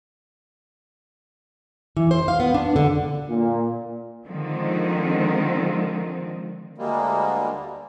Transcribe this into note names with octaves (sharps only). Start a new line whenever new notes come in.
E3
C5
F5
B3
D4
D3
A#2
D3 D#3 F3 G#3 C4
D2 D3 G3 G#3 A#3